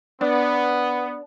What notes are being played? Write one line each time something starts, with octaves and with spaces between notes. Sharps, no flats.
B3 D4